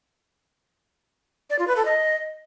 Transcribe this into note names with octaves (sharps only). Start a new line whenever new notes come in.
D5
F4
B4
A4
D#5